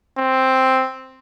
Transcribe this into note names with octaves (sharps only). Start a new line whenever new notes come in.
C4